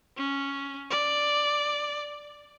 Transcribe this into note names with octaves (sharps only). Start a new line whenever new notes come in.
C#4
D5